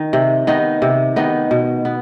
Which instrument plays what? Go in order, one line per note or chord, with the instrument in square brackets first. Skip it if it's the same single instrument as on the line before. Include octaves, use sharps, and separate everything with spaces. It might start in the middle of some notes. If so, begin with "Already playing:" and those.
Already playing: [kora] D#3 D#4
C3
D#3 B3 D#4
C3
D#3 B3 D#4
B2
B3